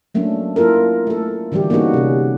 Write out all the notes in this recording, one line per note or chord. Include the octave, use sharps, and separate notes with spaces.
F#3 A3 A#3 C#4 D4
A#3 E4 F4 A4 A#4
A3 A4
D3 E3 G3 F#4 G4
A#3 B3 C#4 D#4 F#4 G#4
C3 C#4